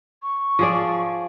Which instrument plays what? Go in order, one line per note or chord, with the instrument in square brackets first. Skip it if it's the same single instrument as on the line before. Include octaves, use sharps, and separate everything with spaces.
[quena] C#6
[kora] F3 G#4 D5